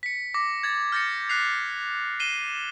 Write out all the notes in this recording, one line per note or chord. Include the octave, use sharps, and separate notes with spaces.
B6 C#7
D6 A#6
G#6 A6
F6 G6 A6 A#6 C#7
F#6 G6 B6 C7 F7
C7 D#7 E7 G7